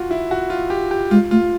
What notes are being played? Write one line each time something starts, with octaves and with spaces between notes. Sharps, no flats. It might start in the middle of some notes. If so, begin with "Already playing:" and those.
Already playing: F4 F#4
E4
F#4
F4
G4
G4
G#3 F4
A3 F4